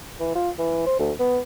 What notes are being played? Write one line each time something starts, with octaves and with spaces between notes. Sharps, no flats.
E3
F4
E3
C5
D2
B3